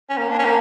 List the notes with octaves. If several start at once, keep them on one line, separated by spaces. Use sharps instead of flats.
C#4
A#3
D4
C#4
A#3